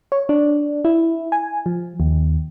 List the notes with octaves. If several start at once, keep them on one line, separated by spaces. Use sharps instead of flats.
C#5
D4
E4
G#5
F3
D#2